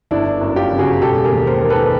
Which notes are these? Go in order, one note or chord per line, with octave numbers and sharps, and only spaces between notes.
G1 D4 E4
F#2
F4 G4
C#3
F#4 G#4
E1 G4 A4
G#4 A#4
D#2
A#4 C5
D#3
A4 B4